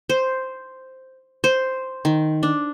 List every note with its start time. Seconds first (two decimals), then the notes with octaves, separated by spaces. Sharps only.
0.09 C5
1.44 C5
2.05 D#3
2.43 D4